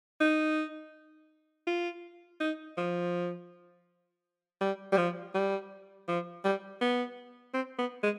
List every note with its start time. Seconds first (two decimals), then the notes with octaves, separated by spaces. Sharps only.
0.20 D#4
1.67 F4
2.40 D#4
2.77 F3
4.60 G3
4.92 G3
4.97 F3
5.34 G3
6.08 F3
6.44 G3
6.81 B3
7.54 C4
7.78 B3
8.03 G#3